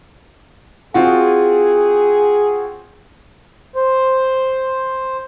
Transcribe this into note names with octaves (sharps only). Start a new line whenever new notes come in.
C4 F4 F#4 G#4
C5